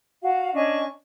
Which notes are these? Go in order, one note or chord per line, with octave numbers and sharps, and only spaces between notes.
F#4 F5
C#4 D4 D#5 C#6